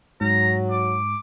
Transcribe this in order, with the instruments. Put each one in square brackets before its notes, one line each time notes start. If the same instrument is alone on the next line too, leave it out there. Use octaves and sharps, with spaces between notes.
[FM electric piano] G#2 [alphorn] F#3 [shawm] A#5
[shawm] D6